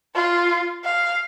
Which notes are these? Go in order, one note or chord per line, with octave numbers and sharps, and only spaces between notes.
F4
F5